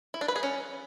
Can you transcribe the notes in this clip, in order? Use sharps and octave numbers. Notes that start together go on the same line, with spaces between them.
E4
D4
B4
G#4
C#4